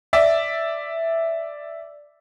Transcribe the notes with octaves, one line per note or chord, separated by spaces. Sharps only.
D5 E5